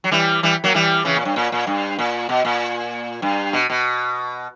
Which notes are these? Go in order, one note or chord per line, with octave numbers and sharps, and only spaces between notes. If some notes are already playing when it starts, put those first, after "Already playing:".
F#3
E3 G3
E3 G3
F#3 A#3
E3 G3
C#3 E3
A#2
G2
A#2
A#2
G2
A#2
B2
A#2
G2
B2
B2